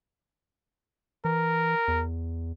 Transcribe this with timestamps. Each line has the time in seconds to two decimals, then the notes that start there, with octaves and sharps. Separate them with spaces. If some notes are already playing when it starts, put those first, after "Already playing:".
1.25 E3 A#4
1.88 E2